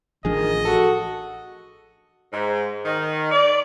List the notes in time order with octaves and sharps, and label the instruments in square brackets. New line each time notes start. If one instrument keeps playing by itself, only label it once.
[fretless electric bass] A1 F3 D4 [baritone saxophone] D#3 [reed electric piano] G#4 [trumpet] D#5
[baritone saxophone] F#4 [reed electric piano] A4
[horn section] G#2
D#3
D5